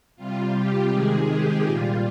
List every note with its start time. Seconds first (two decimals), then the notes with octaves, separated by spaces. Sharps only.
0.16 C3 G3 F4
0.52 G4
0.89 C3 D#3 G#3 G#4
1.26 G4
1.63 A#2 G3 F4